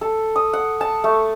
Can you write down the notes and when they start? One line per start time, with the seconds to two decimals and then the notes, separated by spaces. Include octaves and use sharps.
0.01 A4
0.36 D#6
0.53 F#5
0.81 A5
1.04 A3